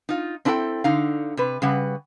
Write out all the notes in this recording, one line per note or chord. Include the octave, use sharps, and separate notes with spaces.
D#4 F4
C4 D4 E4 G4 A4 G5
D3 D#4 F5
C3 B4
C#3 G3 B4 F#5